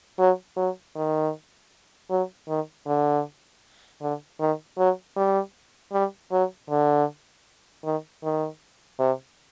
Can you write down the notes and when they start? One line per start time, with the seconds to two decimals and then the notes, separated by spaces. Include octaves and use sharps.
0.19 F#3
0.57 F#3
0.95 D#3
2.10 F#3
2.48 D#3
2.87 D3
4.02 D3
4.40 D#3
4.78 F#3
5.17 G3
5.93 G3
6.32 F#3
6.70 D3
7.84 D#3
8.23 D#3
8.99 C3